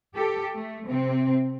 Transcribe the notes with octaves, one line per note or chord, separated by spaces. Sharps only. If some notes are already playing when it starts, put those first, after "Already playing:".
G4 A4
A3
C3 C4